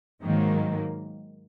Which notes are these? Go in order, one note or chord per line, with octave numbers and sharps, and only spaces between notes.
G#2 D#3 F#3 A#3